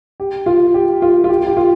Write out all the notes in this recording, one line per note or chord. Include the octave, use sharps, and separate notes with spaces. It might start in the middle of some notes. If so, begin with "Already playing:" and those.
G4
F4
G4
F4
F4
G4
G4
F4